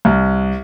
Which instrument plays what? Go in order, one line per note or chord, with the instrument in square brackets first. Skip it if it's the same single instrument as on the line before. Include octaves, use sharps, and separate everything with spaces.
[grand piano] C2